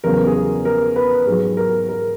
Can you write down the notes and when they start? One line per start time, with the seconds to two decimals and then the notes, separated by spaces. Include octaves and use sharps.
0.04 E2 C#3 F#3 A#4
0.27 G#4
0.34 A#4
0.65 A#4
0.96 B4
1.26 G#2 F#3 G#4
1.57 A#4
1.88 A#4